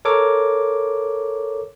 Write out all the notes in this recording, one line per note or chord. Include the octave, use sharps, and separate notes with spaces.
A4 A#4 C#5 D6